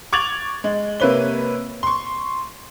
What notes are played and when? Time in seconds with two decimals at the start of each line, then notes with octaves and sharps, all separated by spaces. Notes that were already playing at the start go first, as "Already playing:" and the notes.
0.13 C#6 D6 G#6 A6 F7 F#7
0.64 G#3
1.00 C3 A#3 B4 C#5 G7
1.83 C6 C#6